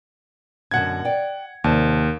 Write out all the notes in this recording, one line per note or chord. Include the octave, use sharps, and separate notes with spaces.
F#2 B2 D3 F#5 G#6
D5 G5
D#2 C3 D5 A5